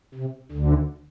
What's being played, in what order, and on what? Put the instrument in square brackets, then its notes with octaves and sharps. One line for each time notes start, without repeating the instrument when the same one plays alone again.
[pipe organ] C3
D2 D3